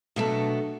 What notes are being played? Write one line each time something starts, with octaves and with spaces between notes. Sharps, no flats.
B2 F#3 A3 D4 A4